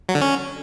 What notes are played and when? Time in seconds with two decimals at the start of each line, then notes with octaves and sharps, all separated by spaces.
0.09 F#3
0.15 D3
0.21 C#4